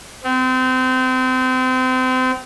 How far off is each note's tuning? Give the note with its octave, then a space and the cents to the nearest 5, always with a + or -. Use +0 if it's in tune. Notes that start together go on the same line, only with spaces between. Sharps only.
C4 -30